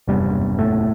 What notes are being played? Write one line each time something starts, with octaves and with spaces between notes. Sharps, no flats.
F#1 E2 G2 C3 G3
A2 A3